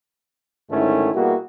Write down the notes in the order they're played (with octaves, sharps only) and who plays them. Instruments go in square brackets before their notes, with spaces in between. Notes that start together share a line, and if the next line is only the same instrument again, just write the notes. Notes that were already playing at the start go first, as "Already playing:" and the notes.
[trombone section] G#2 D3 D#3 A3 C#4 E4
B2 G3 A#3 E4 F#4 G#4